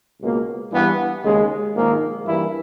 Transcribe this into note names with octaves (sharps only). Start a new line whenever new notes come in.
C#2 B2 A#3
G2 E3 G3 B3
D#2 C#3 G#3
A#1 G#2 D#3 A#3
G2 E3 A#3 E4